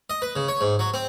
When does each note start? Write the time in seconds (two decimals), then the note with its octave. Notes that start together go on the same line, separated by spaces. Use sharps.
0.10 D#5
0.22 B4
0.36 C#3
0.48 C#5
0.61 G#2
0.79 F#3
0.94 C4